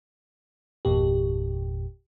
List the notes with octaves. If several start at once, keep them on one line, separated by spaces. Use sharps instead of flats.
G1 E2 A#2 G4